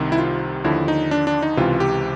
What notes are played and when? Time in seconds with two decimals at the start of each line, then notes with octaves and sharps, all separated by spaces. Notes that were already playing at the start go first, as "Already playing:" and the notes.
Already playing: C2 C3 D#3
0.12 E4
0.18 F4
0.64 D#2 D3 F3 E4
0.88 D#4
1.11 D4
1.27 D4
1.42 D#4
1.57 C#2 C3 E3 F4
1.80 G4